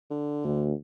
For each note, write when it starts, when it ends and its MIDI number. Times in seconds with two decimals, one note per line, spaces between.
0.10 0.69 50
0.44 0.73 38